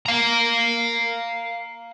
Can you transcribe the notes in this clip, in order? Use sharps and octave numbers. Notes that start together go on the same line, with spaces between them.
F5 A#5